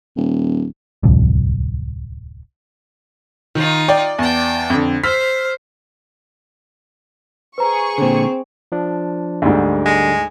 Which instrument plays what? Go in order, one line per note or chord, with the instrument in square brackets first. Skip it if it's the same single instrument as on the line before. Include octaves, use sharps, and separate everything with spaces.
[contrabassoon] D#1
[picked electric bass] D1 C2 F2
[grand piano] D#3 [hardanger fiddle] D#4 F4
[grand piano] D5 [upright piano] G5
[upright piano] E2 [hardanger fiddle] G5 A5
[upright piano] F2 D3
[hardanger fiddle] C5 [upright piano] E6 F6 [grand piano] B6
[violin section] G#4 C#6 [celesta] B4 C5 A#5
[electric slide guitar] A#2 D3 [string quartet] C4
[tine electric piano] F3 D4
[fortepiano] D2 G#2 [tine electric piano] D3 G3
[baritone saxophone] G#3